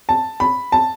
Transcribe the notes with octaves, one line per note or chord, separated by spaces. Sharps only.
A5
B5
A5